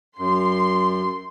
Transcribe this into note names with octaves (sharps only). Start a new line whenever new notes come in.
F#2 C6